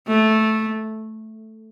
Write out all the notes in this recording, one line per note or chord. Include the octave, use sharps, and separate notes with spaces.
A3